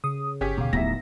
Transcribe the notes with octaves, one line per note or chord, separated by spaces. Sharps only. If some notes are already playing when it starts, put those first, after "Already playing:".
C#3 D#6
G1 C#4 G4 G#4 B6
G1 D#2 B2 F5
D1 F3 B3 D#4 E5 A#6